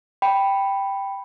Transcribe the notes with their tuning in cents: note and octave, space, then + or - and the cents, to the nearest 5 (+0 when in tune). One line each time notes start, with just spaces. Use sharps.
G5 +0 B5 +0